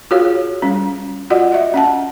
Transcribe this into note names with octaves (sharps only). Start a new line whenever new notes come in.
F4 F#4 G#4 C#5 F5
G3 C#4
F4 F#4 D5 D#5 F#5
D#5 E5
C#4 F#5 A5